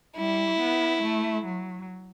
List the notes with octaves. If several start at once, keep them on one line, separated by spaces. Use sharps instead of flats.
G3 E4
B3
A3
F#3